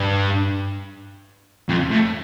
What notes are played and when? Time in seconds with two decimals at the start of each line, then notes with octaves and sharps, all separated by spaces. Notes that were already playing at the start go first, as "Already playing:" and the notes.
Already playing: G2
1.69 F2
1.91 A2